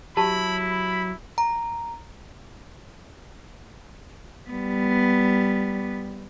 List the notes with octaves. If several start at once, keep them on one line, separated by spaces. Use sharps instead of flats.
F#3 E4 G4 A5 B5
B5
A#5
G3 B3